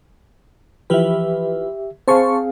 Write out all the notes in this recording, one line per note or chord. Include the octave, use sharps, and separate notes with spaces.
E3 F3 G4 B4 E5
C4 G#4 C5 F5 A5 C#6